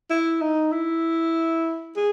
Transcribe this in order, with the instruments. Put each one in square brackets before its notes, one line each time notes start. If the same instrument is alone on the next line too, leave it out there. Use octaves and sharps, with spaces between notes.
[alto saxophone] E4
D#4
E4
G#4